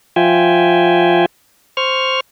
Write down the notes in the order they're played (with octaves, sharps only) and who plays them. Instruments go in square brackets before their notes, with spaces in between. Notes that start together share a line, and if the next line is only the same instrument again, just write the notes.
[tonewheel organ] F3 F4 E5 G5 G#5
C5 C#6 F6